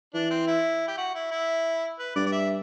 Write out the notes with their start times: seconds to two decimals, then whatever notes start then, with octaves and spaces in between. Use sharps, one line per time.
0.14 E3 D4
0.31 C4
0.48 E4
0.88 G4
0.98 F#4
1.15 E4
1.31 E4
1.99 B4
2.16 G2 D5
2.27 D5
2.32 E5